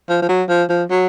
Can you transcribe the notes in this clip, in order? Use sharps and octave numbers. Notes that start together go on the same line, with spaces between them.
F3
F3
F#3
F3
F3
F#3